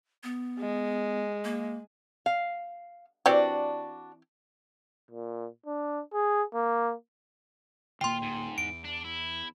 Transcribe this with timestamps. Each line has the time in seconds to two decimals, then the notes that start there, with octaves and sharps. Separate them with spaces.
0.24 B3
0.59 G#3
1.44 A#3
2.26 F5
3.26 E3 C4 D4 F#4 G4 D5
5.11 A#2
5.66 D4
6.13 G#4
6.54 A#3
8.01 D2 A2 A#3 F4 G5 C6
8.22 G#2
8.58 E2 D7
8.85 D4
9.05 E4